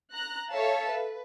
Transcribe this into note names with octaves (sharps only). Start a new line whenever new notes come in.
A#5 F#6
A4 C#5 E5 F5 A5
B4